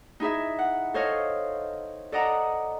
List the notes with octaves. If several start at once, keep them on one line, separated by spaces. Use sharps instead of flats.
D#4 E4 G#4 E5
F#5
A4 C5 C#5 D#5 F5
A4 D5 D#5 F#5 A#5